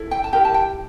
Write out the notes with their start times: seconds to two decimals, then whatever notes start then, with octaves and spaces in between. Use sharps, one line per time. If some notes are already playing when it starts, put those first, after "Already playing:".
Already playing: E4 A4
0.11 G5
0.24 A5
0.33 E4 G4 A#4 G5
0.45 A5
0.54 G5